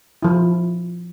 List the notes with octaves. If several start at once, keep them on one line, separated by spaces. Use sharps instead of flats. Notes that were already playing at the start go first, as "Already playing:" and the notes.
F3 E4